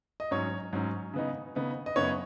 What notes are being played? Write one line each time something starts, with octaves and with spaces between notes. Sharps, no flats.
D#5
G#2 F#3 C#4 C#5
G#2 F#3 C#4
C#3 B3 D#4
C#3 B3 D#4
D#5
F#2 C#3 B3 D#4 C#5